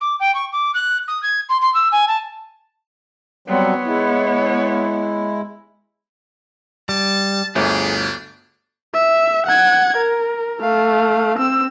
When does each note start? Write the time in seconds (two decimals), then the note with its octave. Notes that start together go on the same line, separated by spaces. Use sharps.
0.01 D6
0.20 G5
0.34 C#6
0.52 D6
0.74 F#6
1.08 D#6
1.23 G#6
1.49 C6
1.61 C6
1.74 E6
1.92 G#5
2.08 A5
3.48 F#3 G3 B3 C4 C#5
3.86 G#3 E4
6.89 G3 A5
7.55 G1 D2 D4 G#4
8.94 E5
9.47 F#5 G#6
9.97 A#4
10.61 A3 F5
11.39 C4 E6